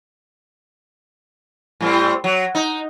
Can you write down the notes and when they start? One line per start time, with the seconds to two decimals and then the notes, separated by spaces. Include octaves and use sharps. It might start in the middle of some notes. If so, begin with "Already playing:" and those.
1.81 A2 G3 C4
2.24 F#3
2.55 D#4